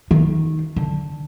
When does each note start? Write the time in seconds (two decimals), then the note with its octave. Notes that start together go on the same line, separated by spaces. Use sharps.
0.11 D#3
0.76 D3